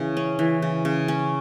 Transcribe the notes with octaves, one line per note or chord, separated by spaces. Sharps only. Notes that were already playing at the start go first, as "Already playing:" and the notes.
Already playing: C#3 E3
C#4
E3
C#3
C#3
C#4